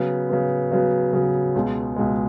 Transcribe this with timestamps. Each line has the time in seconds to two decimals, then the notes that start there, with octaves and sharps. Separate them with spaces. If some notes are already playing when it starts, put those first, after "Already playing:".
Already playing: C#3 F#3 B3
0.29 C#3 F#3 B3
0.72 C#3 F#3 B3
1.13 C#3 F#3 B3
1.55 C#2 B2 G#3
1.96 C#2 B2 G#3